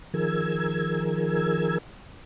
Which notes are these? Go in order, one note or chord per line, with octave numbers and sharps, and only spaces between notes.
D#3 F3 G#4 A#4 E6 G#6